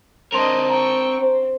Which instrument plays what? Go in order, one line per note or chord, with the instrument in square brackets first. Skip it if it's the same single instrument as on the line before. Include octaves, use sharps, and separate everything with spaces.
[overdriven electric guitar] C4 A#4 [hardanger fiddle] D4 D#5 [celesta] C6 F7
[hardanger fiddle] G5 C#6 [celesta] A#5
[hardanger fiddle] C4